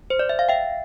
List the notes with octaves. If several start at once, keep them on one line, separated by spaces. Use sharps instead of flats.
C5
D5
E5
F5
E5 G5